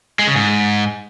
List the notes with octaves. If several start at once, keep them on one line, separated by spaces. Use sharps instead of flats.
G#3
C#3
G#2